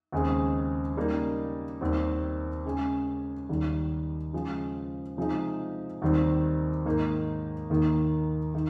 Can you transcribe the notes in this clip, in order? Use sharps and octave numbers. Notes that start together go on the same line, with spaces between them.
D#2 C#3 G#3 C4
C#3 G3 A#3 D#4
D#2 D#3 G3 C4
C#3 G#3 C#4
D#2 D#3 G3
C#3 F3 G#3
C3 F3 G#3 D#4
D#2 D#3 G3 C4
G#2 D#3 A#3 D#4
D#2 D#3 A#3
D#3